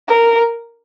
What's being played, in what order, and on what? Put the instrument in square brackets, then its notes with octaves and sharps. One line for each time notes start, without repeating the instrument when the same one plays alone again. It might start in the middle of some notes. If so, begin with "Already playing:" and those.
[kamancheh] A#4